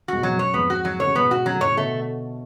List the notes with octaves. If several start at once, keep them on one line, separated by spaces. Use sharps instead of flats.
G#2 B2 F#4
F2 F#3
F#2
C#5
F2 G#2 B3
F#4
F#3
D3 C#5
C#3
G#2 B2 B3
F#4
C#3 F#3
D3
A2 C#3 C#5
B2 D3 A3